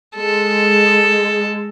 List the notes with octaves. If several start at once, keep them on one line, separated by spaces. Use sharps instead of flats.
G#3 A4